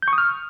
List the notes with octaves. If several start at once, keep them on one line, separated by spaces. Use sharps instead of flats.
G6
C#6
D#6
F6